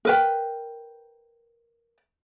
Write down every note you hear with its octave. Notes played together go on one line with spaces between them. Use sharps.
A#4 B4 G5